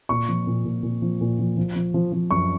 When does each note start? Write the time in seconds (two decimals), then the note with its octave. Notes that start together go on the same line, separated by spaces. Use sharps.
0.09 A#2 C#6
0.28 F3
0.47 A#2
0.65 A#2
0.83 A#2
1.02 F3
1.21 A#2
1.39 F3
1.57 F3
1.75 F3
1.94 F3
2.12 F3
2.31 F#2 C#6